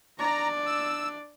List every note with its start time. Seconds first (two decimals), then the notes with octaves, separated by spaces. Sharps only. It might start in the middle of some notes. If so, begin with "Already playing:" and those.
0.19 D4 D5 A#5
0.66 E6